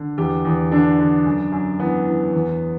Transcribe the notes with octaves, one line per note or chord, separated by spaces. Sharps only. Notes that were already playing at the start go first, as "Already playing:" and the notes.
Already playing: D3
E2 G4
E2
D3 D4
D3
F#2
F#2
E3 B3
E3
E2